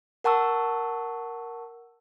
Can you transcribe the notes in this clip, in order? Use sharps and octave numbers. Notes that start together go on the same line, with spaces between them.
A#4 F#5 A5 C#6 E6